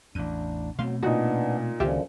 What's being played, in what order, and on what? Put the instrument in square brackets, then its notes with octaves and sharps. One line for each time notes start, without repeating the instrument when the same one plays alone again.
[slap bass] A1 E2 [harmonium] D4 [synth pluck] D#7
[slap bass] B2 A3 C4 [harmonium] F#3 [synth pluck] F5 C6
[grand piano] A#2 D#4 [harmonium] B3 D4 [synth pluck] F#4
[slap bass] C#2 D#3 [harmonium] F#2 D3 F3 [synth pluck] F4 G4 E5